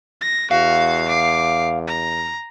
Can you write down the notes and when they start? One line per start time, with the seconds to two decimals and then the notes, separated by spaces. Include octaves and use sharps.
0.21 A#6
0.51 E2 F#4 F5
1.08 D6 C7
1.87 A#5